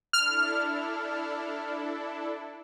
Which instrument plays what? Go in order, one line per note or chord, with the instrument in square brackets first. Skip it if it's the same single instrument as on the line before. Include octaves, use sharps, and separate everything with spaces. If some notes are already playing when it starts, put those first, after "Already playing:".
[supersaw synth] D4 E4 A4 [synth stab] F6